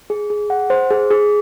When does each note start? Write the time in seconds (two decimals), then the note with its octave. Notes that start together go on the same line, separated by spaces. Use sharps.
0.10 G#4
0.30 G#4
0.50 F#5
0.70 C5
0.90 G#4
1.10 G#4